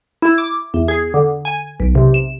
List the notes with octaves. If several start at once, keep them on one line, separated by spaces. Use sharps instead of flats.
E4
D6
E2
G#4
D3
G#5
B1
C3
E7